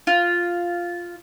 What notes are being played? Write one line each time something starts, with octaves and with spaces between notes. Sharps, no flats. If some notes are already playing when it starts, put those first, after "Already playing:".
F4